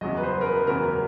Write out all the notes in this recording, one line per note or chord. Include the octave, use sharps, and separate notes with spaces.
F#1 E2 C#3 F#3 D#5
B4
C5
A#4
B4
F#1 E2 C#3 F#3 A#4